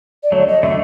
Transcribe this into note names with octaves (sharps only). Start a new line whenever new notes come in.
D5
D3 F#3 A3 C#5
D#5
D3 F#3 A3 E5